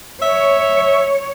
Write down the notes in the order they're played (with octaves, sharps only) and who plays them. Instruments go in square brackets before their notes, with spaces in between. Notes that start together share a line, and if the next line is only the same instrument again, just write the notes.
[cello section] C#5 [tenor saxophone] E5